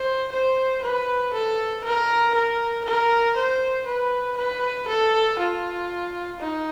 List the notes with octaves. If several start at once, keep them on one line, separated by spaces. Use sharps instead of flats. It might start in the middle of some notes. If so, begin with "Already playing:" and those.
Already playing: C5
C5
B4
A4
A#4
A#4
A#4
C5
B4
B4
A4
F4
D#4